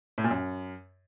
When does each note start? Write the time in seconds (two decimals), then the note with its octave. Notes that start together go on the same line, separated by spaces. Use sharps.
0.18 A2
0.24 A#2
0.31 F#2